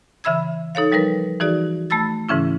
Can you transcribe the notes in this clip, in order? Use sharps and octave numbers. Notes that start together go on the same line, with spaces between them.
C#3 E3 E5 B5 E6 G#6
D#4 A4 C#5 F5
F3 G3 D#4 A#4 B4
E3 D#4 F#4 G#4 D5
A3 A5 B5 E6 A6
G#2 C#3 E3 C#4 E4